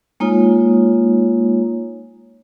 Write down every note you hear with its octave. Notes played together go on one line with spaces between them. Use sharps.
G#3 A#3 D#4 F4 C#5